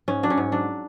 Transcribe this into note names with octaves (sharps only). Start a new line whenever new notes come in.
G#2 C#4
F#3 D4
C#4
G#2
F#3 D4